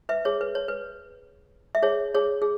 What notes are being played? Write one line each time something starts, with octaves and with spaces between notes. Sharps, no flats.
B4 E5
G#4 C#5
B4
C#5
B4
E5
G#4 C#5
G#4 C#5
G#4